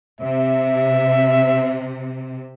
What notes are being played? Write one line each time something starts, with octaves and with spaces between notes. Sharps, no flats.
C3 E5